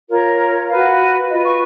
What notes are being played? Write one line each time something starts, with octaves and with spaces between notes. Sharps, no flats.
F4 A#4 C#5
F#4 B4 F5
F4 B4 D#5
C#6